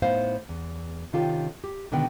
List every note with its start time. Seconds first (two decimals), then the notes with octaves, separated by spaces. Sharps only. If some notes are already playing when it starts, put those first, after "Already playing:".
0.02 A2 B3 D#4 C5 F5
0.49 E2
1.13 C3 D#3 C#4 F4 G4 A4
1.64 G4
1.92 B2 D3 D#3 G#3 B3 G5